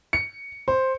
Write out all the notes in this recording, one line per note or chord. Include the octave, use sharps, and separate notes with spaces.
C#7
C5